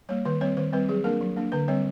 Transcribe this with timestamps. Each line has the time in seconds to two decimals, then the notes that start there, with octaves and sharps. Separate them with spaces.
0.09 G3 A#3 C#5
0.25 D#3 B4
0.41 G3 C4 C#5
0.57 D#3 C5
0.73 G3 C4 B4
0.89 F#3 G#4
1.04 A#3 D4 A#4
1.21 F#3
1.36 A#3 D4
1.52 D3 B4
1.68 G3 C4 C#5